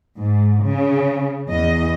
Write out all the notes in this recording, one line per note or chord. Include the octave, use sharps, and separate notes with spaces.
G#2
C#3
E2 D#5